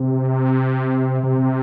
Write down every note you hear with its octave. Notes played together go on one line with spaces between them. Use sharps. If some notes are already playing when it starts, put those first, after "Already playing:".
Already playing: C3
C3